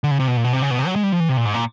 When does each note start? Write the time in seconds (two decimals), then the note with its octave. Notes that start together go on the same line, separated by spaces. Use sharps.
0.04 D3
0.11 C#3
0.20 C3
0.28 B2
0.37 A#2
0.44 B2
0.53 C3
0.62 C#3
0.71 B2
0.78 C3
0.87 F#3
0.96 G#3
1.04 G3
1.12 F3
1.20 E3
1.29 C3
1.37 A#2
1.45 G#2
1.54 A#2